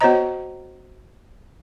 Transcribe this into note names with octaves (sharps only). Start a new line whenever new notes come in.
B3 F#4 C5 C#5 D#5 A#5